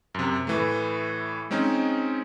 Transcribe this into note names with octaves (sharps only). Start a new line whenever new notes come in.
F#2 C3
A2 E3 A3
G#3 C4 C#4 D#4